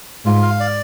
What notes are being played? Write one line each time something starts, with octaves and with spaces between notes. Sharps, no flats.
G#2 F4
F5
D5